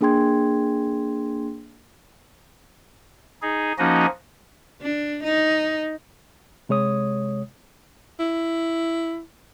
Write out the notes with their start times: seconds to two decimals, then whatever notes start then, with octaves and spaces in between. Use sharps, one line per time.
0.01 A#3 D4 G#4 G5 C6 G#6
3.42 D#4 G#4
3.79 F3 A#3 C#4 D#4 F#4 D#5
4.82 D4
5.24 D#4
6.69 C3 G#3 C#5 D#6
8.20 E4